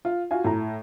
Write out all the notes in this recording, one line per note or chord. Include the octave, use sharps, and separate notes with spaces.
F4
F4 F#4 F5 G#5
A2 A#5